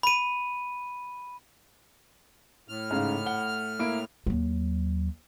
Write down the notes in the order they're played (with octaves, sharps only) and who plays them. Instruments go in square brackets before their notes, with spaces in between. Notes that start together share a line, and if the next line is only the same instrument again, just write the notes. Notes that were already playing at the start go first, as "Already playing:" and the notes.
[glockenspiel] B5 D#7
[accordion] A2 F6
[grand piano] G#2 C#3 F5
F#5 G7
A#3 E4 D7
[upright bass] D#2 F#3